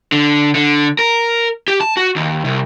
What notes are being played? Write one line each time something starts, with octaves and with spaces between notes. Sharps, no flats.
D3
D3
A#4
G4
A5
F#4
D#2
C2